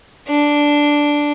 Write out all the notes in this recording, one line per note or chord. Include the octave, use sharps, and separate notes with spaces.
D4